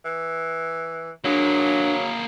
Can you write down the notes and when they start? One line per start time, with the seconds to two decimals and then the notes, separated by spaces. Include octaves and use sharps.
0.05 E3
1.24 F#3 A#3 D4 G#4